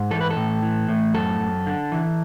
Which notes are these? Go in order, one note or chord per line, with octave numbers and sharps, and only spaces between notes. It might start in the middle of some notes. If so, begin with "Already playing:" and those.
Already playing: G#2
E3 A4
B4
A4
A2
E3
A2
F#2 A4
F#2
D3
E3